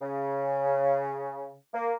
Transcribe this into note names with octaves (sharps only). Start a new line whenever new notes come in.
C#3
A#3